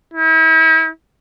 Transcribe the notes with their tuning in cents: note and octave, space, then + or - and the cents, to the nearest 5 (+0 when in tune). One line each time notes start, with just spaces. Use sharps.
E4 -40